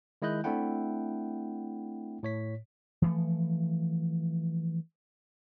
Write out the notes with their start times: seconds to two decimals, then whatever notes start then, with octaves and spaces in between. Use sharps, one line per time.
0.22 D#3 G#3 E4 D#5 F#6 G6
0.44 A3 C4 D4 E4 F#5 G5
2.23 A2 C#5 B6
3.02 E3 F3 A3